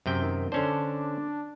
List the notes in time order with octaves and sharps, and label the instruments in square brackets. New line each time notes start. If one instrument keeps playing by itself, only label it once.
[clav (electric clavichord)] F#2 C3 G5
[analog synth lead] D#3
[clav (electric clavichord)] D3 C#4 C5 [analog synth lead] D4